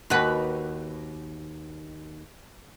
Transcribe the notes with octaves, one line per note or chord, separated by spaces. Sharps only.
D#2 F#4 B4